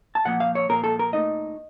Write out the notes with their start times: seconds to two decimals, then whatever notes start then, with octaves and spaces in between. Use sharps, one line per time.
0.15 A5
0.25 A#2 F3 A#3 F#5
0.40 F5
0.55 C#5
0.69 A#2 F3 A#3 A#4
0.84 A4
0.99 A#4
1.13 A#2 A3 D#4 D#5